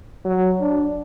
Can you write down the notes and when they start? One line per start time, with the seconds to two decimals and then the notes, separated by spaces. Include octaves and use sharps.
0.25 F#3
0.61 D4